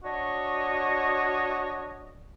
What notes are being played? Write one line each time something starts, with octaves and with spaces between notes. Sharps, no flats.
D4 F#4 C#5 D#5